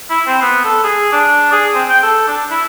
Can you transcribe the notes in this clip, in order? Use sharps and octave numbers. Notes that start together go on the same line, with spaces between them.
E4
C4
B3
A4
G#4
D4
G#4
C4
G5
A4
D4
E4